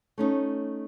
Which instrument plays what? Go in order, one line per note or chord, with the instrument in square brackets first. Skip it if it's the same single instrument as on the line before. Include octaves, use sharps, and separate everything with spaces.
[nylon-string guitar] A3 C#4 D#4